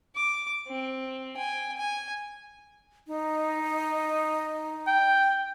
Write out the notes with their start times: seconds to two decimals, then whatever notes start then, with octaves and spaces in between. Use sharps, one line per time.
0.16 D6
0.68 C4
1.37 G5 G#5
1.77 G#5
3.07 D#4
4.87 G5